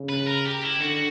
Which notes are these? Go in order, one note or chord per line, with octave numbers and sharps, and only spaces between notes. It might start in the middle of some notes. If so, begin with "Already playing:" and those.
Already playing: C#3
B4
A#4
G4
E4
D3 F#4